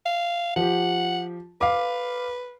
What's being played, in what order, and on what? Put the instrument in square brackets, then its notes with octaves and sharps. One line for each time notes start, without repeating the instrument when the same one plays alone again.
[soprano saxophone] F5
[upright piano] F3 G4 [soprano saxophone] F#5
[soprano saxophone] B4 [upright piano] F5 D6